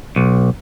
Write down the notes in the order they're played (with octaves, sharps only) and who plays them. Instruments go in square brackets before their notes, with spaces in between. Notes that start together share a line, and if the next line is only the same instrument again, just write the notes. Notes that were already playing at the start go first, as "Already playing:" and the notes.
[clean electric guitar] B1